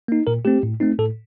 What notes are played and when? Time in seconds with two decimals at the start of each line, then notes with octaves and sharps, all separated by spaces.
0.08 A#3 D#4
0.27 A#2 A#4
0.45 A3 C4 G4
0.63 A2
0.80 A3 C4 D#4
0.99 A2 A4